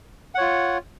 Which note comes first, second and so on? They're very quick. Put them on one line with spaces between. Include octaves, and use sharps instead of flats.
F#5 C#5 F4